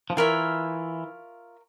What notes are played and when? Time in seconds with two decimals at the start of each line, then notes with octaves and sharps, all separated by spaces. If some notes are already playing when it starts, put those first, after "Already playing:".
0.10 F3
0.17 E3 F4 A#4 C#5 E5